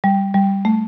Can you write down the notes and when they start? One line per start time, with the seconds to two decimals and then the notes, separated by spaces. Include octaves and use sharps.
0.04 G3
0.34 G3
0.65 A3